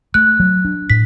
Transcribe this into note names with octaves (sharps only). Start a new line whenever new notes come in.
A3 F#6
F#3
D4
A2 B6